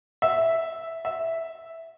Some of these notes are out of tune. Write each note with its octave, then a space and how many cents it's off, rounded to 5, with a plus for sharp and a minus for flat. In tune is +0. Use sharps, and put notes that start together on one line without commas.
E5 -5
E5 -5